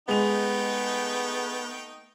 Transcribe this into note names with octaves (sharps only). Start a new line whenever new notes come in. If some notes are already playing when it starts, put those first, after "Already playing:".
G#3 A3 B3 D#4 G5 F7